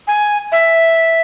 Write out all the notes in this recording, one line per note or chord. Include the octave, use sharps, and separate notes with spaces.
G#5
E5